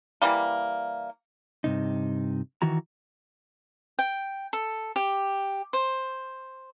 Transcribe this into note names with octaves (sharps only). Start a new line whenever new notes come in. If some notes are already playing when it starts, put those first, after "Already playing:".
E3 G3 A#3
G2 C3 D#4
D#3 E3 F#4 A#5
G5
A4
G4
C5